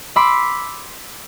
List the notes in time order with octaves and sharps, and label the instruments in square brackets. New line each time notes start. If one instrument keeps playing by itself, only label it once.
[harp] B5 C6 D6 E6